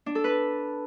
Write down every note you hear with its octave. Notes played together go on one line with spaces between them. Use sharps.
D4
A4
B4